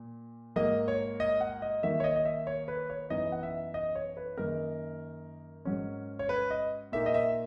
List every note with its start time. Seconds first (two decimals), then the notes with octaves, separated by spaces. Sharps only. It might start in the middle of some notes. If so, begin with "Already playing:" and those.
Already playing: A#2
0.56 G#2 F#3 A#3 D#5
0.88 C#5
1.20 D#5
1.41 F#5
1.62 D#5
1.83 D#3 F#3 A#3 E5
2.00 C#5
2.04 D#5
2.16 D#5
2.25 E5
2.47 C#5
2.68 B4
2.90 C#5
3.10 F#2 E3 B3 D#4 D#5
3.32 F#5
3.43 E5
3.74 D#5
3.95 C#5
4.17 B4
4.38 F#2 D#3 A#3 D#4 A#4
5.65 G#2 F#3 C#4
6.19 C#5
6.29 B4
6.51 D#5
6.92 A#2 A#3 D#4 E5
7.06 D#5
7.14 E5